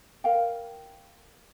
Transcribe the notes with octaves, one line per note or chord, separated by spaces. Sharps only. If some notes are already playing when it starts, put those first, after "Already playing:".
A#4 F5 G5